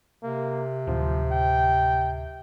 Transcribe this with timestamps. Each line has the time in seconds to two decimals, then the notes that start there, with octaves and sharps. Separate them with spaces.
0.24 C3 A#3
0.87 D1 F3
1.31 G5